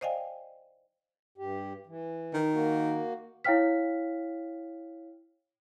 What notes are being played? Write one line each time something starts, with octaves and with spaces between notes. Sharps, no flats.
C5 D5 D#5 F5 G5 G#5
G2 G4
E3
D#3
A#3 F#4
E4 C#5 F5 G5 F6 B6